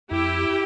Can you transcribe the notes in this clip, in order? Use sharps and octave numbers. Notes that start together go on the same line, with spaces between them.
F2 E4 G4